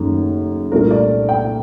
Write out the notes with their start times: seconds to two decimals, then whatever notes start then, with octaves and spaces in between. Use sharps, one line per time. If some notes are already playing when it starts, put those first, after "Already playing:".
Already playing: F#1 F#2 D#3 A3
0.71 C2 A#2 A3 D4 A#4
0.91 D5
1.29 G5